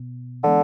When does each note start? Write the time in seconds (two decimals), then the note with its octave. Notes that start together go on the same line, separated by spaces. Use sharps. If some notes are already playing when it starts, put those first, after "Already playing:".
Already playing: B2 B3
0.44 D3 E3 G#3 B3